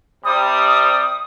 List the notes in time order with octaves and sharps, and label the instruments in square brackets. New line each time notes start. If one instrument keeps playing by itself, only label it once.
[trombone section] C3 G3 [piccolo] D#6